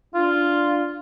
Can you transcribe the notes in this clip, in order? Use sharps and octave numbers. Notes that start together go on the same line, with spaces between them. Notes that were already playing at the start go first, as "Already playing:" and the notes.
D4 F4